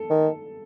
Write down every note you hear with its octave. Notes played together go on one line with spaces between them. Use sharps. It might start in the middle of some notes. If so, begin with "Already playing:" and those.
Already playing: A4
D#3